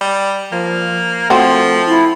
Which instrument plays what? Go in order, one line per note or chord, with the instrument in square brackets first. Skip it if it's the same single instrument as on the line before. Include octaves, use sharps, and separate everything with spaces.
[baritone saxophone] G3
[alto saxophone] F3 [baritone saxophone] A#3
[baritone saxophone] F3 [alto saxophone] A3 [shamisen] C4 F#4
[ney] E4